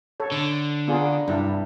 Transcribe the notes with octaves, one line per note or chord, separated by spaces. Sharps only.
A4 C#5
D3
B3 F4 G#4 D5 A#5
G2 C3 D4 E4